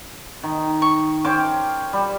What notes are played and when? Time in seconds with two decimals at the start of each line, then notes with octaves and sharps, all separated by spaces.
0.43 D#3
0.82 C#6
1.25 C#4 C5 G5 D6
1.93 G3